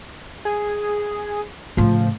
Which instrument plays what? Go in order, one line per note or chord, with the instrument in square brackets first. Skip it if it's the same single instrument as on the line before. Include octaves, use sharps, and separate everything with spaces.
[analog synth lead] G#4
[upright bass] A2 C#3 [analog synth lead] F3